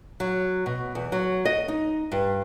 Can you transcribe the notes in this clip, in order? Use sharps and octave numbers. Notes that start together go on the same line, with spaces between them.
F#3
B2
E2
F#3
D#5
D#4
G2